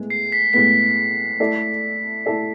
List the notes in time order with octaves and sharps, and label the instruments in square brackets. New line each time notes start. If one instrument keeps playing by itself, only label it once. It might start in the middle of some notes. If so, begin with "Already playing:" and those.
Already playing: [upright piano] A2 G#3 B3
[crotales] C7
B6
[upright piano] A2 G#3 B3 [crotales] B6
[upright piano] A3 E4 A4 D5
A3 E4 A4 D5